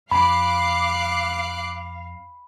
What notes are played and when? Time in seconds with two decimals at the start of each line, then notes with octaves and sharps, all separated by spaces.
0.11 F2 F5 B5 D6 F#6 C7